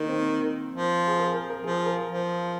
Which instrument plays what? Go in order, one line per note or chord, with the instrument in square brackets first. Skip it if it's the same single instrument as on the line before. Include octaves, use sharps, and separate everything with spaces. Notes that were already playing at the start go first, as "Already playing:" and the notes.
Already playing: [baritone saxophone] D#3 [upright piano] A#3
[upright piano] C4
[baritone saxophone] F3
[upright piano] G#4
A#4
A#4
A#4
[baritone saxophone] F3 [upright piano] G#4
[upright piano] A#4
[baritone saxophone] F3